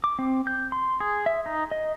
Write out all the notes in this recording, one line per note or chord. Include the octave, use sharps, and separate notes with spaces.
D6
C4
G6
C6
G#4
E5
D#4
D#5